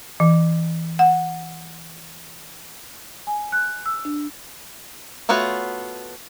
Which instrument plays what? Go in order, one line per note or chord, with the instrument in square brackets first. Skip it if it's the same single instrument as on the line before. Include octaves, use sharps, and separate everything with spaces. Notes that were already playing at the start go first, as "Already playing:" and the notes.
[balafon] E3
F#5
[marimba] G#5
F#6
E6
D4
[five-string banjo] A3 B3 F4 F#4 C#5